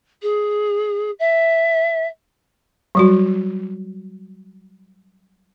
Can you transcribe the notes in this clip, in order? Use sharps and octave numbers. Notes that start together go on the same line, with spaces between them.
G#4
E5
F#3 G3 F#4